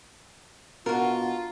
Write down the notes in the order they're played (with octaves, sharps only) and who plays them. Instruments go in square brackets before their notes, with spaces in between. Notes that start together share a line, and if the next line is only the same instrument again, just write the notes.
[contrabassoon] B2 [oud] D4 F#4 [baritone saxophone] F4 [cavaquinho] A#4